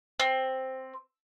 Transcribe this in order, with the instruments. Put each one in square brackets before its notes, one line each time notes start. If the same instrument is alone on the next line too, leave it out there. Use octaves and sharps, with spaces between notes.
[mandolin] C4